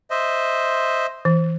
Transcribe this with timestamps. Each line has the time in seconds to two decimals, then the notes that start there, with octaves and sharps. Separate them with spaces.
0.11 C5 D#5 E5
1.25 E3